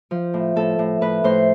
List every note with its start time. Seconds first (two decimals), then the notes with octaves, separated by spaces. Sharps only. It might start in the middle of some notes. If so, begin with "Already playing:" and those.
0.11 F3
0.34 A2
0.56 A2 A4
0.79 A2
1.01 A2 B4
1.24 A2 C5